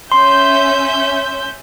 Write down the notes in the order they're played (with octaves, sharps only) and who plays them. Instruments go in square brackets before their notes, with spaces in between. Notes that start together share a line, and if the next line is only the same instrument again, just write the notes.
[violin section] C#4 E5 G6 [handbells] C6